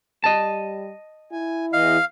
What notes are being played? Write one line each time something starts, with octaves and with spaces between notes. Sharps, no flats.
G3 D#5 A5
E4 G#5
E2 E3 D#5 F5